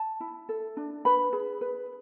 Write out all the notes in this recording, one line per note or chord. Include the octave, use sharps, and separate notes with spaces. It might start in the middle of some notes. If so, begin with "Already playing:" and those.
Already playing: A5
E4
A4
D4
B4 B5
G#4
B4